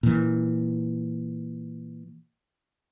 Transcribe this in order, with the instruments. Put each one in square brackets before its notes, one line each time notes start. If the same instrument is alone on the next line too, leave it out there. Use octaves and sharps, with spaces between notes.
[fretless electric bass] A#2 E3